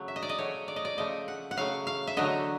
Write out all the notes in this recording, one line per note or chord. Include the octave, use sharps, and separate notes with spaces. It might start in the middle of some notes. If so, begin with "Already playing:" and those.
Already playing: C#3 F#3 A3
E5
D#5
D5
D#5
C#3 F#3 A3 C#5
D5
D#5
D5
C#3 F3 A3 D#5
F#5
F#5
C#3 F#3 A3 F5
F5
E5
D3 F#3 A3 D#5